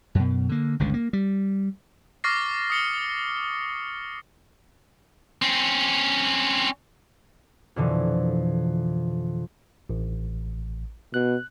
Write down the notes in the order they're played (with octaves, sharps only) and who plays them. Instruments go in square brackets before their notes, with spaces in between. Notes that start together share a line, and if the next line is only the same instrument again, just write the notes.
[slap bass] F#2 B2
D3 A#3
G1 C#2 D3
A#3
G3
[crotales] C#6 D6 F6 A6 A#6 C7
D#6 C#7 G7
[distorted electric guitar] C4 C#4
[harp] F2 B2 D3 E3
[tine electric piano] A1
[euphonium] B2 [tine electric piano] F#6